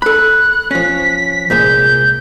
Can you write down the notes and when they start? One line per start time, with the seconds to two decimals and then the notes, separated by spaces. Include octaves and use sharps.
0.02 A4 B5 F#6
0.71 F3 C#4 B6
1.50 C2 A#2 G#3 G6